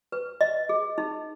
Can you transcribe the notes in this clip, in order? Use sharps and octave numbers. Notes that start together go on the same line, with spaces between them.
B4
D#5
G#4
D#4